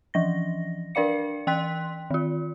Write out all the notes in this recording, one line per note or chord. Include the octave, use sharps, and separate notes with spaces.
E3 F3 A#6
D4 A#4 D5 F5 C#7
E3 G5 C6 F#6 B6
D#3 F4